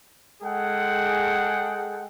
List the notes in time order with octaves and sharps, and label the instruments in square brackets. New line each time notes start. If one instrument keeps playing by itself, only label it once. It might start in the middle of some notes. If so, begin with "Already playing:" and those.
[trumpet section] G#3 G#4 A4 F#5 G5